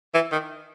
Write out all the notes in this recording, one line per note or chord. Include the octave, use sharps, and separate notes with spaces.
E3
D#3